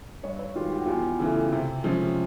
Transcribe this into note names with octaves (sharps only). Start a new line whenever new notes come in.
G2 C#5 D#5
B4 C#5
D#3 G#3 F4 G4
G4
F#4
E2 F4 G4
C#3 E3 A3
C3
F3 G#3 C#4